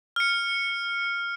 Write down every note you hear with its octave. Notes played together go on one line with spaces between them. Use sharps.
F6 C#7